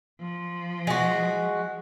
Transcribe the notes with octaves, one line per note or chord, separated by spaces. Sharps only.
F3
G#3 F#4